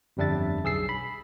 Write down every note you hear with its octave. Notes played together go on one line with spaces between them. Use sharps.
G1 F2 G3 D4 E5 A6
B1 G#4 E6 C7
B5